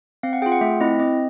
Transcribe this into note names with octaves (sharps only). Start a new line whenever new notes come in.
C4 F5
F#5
F4 G#4 G5
F#5
A3 E5
C4 E4 D#5
C4 D#5